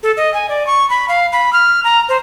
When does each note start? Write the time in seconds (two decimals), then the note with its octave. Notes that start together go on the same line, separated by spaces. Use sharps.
0.03 A4
0.17 D#5
0.34 G#5
0.49 D5
0.67 C#6
0.90 B5
1.08 F5
1.32 B5
1.53 F6
1.84 A#5
2.09 C5